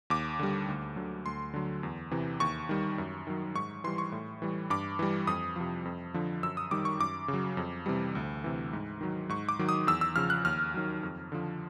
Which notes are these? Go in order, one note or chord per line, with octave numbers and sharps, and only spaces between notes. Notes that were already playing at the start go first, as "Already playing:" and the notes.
D#2 D6
D3 G3
D2
D3 F#3
D2 C6
D3 F#3
E2
C3 E3
D#2 C#6
D#3 G3
F#2
D#3 F#3
G#2 C#6
E3 G3 C6
C#6
A2
E3 G3
G2 D6
E3 G3
F2 D#6
C3 F3
F2
D3 F3
F#2 E6
D#6
D#3 G3 D6
C#6
F#2 D6
C#3
F#3
F2
C3 E3 G3
D2
C3 E3
G#2
D#3 F#3
G#2 C#6
D6
D#3 F#3
D#6
E2 E6
E6
C#3 F3 F6
F#6
D#2 F6
D#3 F#3
F2
D3 F3